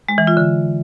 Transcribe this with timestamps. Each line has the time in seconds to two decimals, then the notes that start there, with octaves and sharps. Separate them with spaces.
0.09 G#3
0.18 E3
0.27 F4
0.37 D3